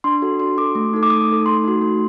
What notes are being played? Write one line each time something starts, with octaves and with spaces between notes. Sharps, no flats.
D4 C6
F#4 A4
D4 C6
F#4 A4 D6
A3
D#4 A4
D6
A3 D#6
D#4 A4
A3 C6
D#4 F#4
A3